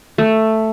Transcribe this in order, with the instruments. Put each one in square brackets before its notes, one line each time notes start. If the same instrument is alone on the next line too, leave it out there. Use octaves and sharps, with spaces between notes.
[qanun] A3